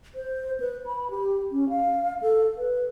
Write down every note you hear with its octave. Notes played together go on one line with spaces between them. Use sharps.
C5
B4
B5
G4
C#4
F5
A4
B4